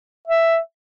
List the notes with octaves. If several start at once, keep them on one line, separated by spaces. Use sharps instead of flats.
E5